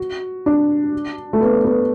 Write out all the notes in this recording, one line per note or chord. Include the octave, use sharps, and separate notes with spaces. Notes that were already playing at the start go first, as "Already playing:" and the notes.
Already playing: F#4
D4
A3
B3
B3